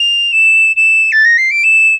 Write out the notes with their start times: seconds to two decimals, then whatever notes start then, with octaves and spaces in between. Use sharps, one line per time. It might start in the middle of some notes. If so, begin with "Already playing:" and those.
Already playing: F7
0.32 E7
0.76 E7
1.12 A6
1.25 A#6
1.38 C7
1.50 D7
1.63 E7